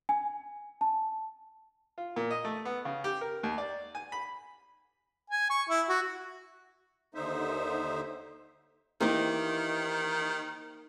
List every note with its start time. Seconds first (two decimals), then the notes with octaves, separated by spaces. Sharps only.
0.09 G#5
0.81 A5
1.98 F4
2.16 A#2
2.31 D#5
2.45 A3
2.65 B3
2.85 C#3
3.04 G4
3.21 A#4
3.43 D#2
3.58 D5
3.95 G#5
4.12 B5
5.30 G#5
5.50 C#6
5.69 E4
5.89 F#4
7.15 D#2 D3 D#4 C5 E5
9.00 D#3 E3 A#3 D#4 G4 C5